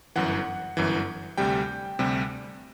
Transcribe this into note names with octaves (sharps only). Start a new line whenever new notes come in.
G1 F#2 E3 F#5
G1 F#2 E3
D2 C3 G3 G5
D2 C3 G3